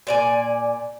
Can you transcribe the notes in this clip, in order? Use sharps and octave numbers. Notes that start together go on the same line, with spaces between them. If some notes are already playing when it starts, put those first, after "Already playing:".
A#2 D5 G#5